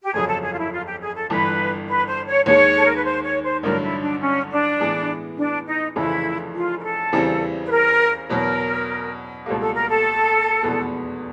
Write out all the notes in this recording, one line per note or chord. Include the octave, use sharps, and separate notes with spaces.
G4
G1 F2 C#3 F#3 G#4
A4
G#4
F4
E4
F4
G4
G#4
A4
G1 G2 E3 B4
B4
C5
C#5
D#2 D#3 G#3 C#5
A4
A#4
B4
C5
C#5
C5
A1 G2 D3 F#3 A#4
E4
D4
C#4
D4
A2 E3 G#3 B3
D4
D#4
F1 F2 C#3 E3 E4
F4
A#4
A4
E2 C#3 E3 G3 C4
B4
A#4
E2 B2 F#3 A#4
C#2 B2 G3 A#3 A4
A4
A#4
A4
F1 E2 B2 G#3 B3